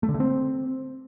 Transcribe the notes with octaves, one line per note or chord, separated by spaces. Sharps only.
A3
D3
A3
C4